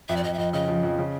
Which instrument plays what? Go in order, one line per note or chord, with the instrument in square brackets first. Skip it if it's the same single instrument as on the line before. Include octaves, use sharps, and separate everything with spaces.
[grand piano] F2 [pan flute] E5
[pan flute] D5
[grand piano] F2 [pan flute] D#5
[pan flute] E5
[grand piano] F2 [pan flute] D#5
[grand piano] C#3 [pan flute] D#5
[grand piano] F3
F2
C#3